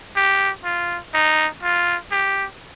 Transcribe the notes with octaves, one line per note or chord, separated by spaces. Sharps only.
G4
F4
D#4
F4
G4